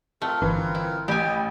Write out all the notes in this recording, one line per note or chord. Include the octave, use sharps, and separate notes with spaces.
A3 C4 F4 A#4
G1 E3
E4
A1 G4 D#5 G#5 B5